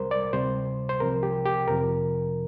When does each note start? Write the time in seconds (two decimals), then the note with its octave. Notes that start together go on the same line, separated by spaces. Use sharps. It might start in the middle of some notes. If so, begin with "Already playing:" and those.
Already playing: C2 C3 G3 A#4 C5
0.11 D5
0.33 D2 C3 G3 C5
0.89 C5
1.00 C2 C3 F3 A#4
1.23 G4
1.46 G4
1.68 F2 C3 F3 A#4